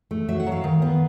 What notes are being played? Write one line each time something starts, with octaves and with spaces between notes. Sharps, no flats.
A3
F#3 E5
F#5
F#3
F5
D#3
B3